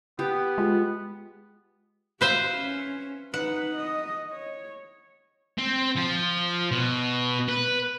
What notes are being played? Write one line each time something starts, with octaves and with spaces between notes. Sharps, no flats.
B3 G4
G#3 F4
F#4 B4 C5 E5 F5
C#4
D#4 B4 F#5
D#5
C#5
C4
F3
B2
B4